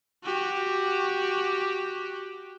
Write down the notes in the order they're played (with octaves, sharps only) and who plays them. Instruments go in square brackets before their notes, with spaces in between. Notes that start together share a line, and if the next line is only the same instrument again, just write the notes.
[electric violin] F#4 G4